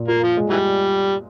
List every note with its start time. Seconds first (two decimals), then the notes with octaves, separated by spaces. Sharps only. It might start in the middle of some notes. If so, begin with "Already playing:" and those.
Already playing: A#2
0.08 A#3 F4
0.23 F3
0.37 G#3
0.50 E3 G3